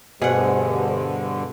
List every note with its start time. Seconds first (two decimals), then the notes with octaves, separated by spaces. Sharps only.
0.22 D2 G2 B2 D3 G3 G#4 C5 F#5